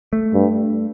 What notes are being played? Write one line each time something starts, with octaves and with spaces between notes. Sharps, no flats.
A3
G2